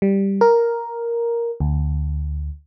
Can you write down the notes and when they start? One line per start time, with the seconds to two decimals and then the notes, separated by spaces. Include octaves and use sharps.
0.02 G3
0.41 A#4
1.60 D2